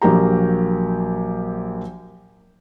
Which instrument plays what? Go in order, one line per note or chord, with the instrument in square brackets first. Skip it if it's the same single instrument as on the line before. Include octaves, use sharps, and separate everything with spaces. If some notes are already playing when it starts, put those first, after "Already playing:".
[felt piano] A#1 F#3 A#3 G4 A#5